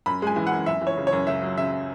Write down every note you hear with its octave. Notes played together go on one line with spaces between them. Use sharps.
F#2 B5
G#3 G#5
E3
F#2 F#5
F#2 E5
E3
C#5
C#3
C#5
F#2
C#2 E5
F#3
C#3 E5